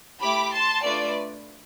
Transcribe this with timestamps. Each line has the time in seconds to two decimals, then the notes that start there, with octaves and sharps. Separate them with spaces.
0.21 A3 E4 G4 B5 D6
0.53 A5 C6
0.84 A3 D4 F4 B4 D5